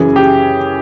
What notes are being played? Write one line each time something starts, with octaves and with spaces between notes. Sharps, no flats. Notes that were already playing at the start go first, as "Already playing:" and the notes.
Already playing: F#2 C#3 E3 G#4
G4